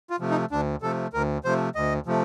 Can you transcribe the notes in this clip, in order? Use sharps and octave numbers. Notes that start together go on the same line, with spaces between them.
F4
C3 F3 A3
D#4
D2 D4
C3 F3 A3 A4
D2 A#4
C3 F3 A3 C5
D2 D#5
C3 F3 A3